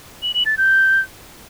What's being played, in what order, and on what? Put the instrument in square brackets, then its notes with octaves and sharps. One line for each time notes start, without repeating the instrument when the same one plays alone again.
[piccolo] F#7
F#7
A6
G6